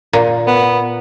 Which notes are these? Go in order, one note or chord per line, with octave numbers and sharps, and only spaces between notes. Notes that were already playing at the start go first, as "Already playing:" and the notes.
A#2
B3